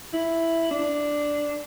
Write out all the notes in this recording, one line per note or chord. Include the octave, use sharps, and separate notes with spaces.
E4
D4